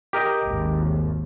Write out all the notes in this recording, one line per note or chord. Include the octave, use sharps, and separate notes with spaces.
G4 A#4 D#5
G#1 D#2